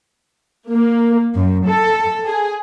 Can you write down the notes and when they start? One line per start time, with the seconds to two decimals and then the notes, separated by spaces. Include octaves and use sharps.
0.71 A#3
1.35 F#2
1.68 A4
2.26 G#4